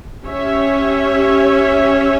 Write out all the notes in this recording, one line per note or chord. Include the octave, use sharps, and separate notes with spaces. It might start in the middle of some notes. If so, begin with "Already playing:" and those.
C#4 G4 C#5 E5